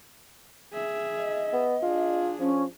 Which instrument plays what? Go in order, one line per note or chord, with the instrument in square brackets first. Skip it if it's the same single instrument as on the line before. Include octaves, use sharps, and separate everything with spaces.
[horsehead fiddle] G#4 E5
[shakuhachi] D#5
[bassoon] B3
[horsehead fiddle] D4 G#4 [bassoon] F4
[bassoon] F3 [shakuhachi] C#4